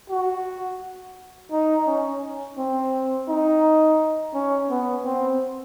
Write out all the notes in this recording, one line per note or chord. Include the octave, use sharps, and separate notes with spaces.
F#4
D#4
C#4
C4
D#4
C#4
B3
C4